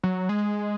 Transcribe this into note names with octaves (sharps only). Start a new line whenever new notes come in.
F#3
G#3